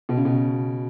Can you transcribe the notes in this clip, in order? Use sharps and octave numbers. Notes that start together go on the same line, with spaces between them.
B2
C#3
B2